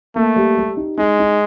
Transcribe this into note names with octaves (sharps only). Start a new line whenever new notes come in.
A3 A#3
G3
G3
D#4
G#3 D#4
D#4